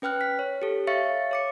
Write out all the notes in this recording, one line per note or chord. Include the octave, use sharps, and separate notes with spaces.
C#4 B4 G5 F6 F#6
B6
C#5
G4 A4
C#5 E5 F5 C#6 A6 C#7
C#5 D6 C#7